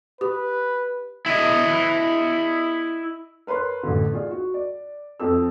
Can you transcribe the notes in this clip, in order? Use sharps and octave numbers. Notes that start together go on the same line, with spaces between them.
G4 B4
E4 D#5
A#4 B4 C#5 C6
A1 D3
F4 G#4 D5
F#4
D5
F2 F3 C4 A4 E6